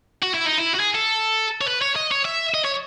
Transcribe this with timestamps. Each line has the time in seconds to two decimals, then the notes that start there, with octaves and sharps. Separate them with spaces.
0.22 F#4
0.34 E4
0.46 D#4
0.58 E4
0.74 F#4
0.80 G#4
0.95 A4
1.61 C#5
1.67 B4
1.82 C#5
1.96 D#5
2.11 C#5
2.25 E5
2.54 D#5
2.64 C#5